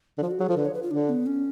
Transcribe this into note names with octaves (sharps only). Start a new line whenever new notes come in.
D3
F3 F4
F#4
F#3 G#4
F3 A4
D3 B4
C#5
B4
F4
D3 D4
B3
C#4